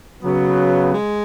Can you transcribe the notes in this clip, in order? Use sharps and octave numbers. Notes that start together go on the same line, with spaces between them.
C#3 F#3 B3
G#3